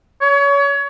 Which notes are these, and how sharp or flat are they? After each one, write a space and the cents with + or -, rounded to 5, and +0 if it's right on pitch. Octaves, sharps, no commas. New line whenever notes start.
C#5 +30